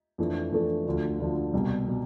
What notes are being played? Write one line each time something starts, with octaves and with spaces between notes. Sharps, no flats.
F2 E3 A3 D4 A4
F2 E3 A3 D4 A4
D2 D3 F3
D2 D3 F3
C2 B2 G3
B2 G3